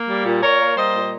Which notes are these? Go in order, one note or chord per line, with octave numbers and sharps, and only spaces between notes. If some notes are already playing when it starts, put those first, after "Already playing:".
Already playing: A#3
G3
A#2
A#2 A#4 C#5
A#3
G3 C5 D#5
A#2